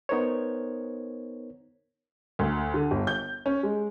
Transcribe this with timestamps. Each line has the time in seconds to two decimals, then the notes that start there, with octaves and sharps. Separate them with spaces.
0.09 B3 D#4 A#4 C5 C#5
2.39 D2
2.74 D3
2.91 G1
3.07 G6
3.46 C#4
3.63 G#3